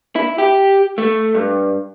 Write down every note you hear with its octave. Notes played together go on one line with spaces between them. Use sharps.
E4
G4
A3
G2